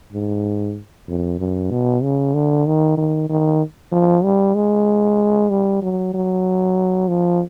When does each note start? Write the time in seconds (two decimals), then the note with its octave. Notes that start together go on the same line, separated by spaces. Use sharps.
0.12 G#2
1.08 F2
1.39 F#2
1.71 B2
2.03 C#3
2.34 D3
2.66 D#3
2.97 D#3
3.29 D#3
3.92 F3
4.24 G3
4.55 G#3
5.50 G3
5.82 F#3
6.14 F#3
7.08 F3